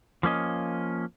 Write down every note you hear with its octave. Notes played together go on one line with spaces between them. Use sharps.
F3 A#3 C#4 D#5